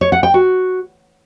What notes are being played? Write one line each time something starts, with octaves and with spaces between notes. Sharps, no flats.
C#5
F#5
G5
F#4